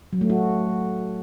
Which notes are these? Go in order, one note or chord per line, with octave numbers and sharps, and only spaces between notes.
F#3
A3
F#4